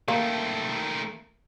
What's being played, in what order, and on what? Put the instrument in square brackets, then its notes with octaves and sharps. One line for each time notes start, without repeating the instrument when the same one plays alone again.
[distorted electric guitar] D#3 A3 [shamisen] A#3